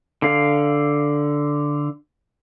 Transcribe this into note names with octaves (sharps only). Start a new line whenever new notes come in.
D3 F5